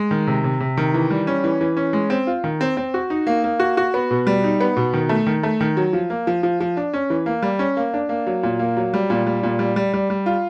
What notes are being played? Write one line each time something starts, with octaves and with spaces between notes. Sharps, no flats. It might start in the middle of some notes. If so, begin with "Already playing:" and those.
Already playing: G#3
D#3
C3
C3
C3
D#3
E3
G3
C#4
E3
E3
C#4
G#3
C4
F4
D#3
C4
C4
F#4
D#4
A#3
A#3
F#4
F#4
B3
B2
G3
D#4
B3
B2
D#3
A3
D#3
A3
D#3
F#3
F3
A#3
F3
F3
F3
D4
C#4
E3
A#3
G3
C#4
A#3
D4
A#3
F#3
A#2
A#3
F#3
G3
A#2
G3
A#2
G3
G3
G3
G3
F4